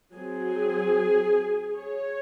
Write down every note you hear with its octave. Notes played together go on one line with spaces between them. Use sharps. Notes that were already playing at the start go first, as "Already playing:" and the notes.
F#3 C4 G#4
C#5